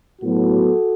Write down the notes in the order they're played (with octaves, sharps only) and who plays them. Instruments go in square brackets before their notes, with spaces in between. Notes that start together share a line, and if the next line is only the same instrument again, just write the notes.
[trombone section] A2 F#3 B3 F#4 A4